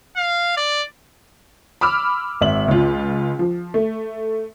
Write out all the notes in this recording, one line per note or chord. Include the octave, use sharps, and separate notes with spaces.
F5
D5
B5 D6 E6 F6
G#1 E5 F#7
C#2 F4
F3
A3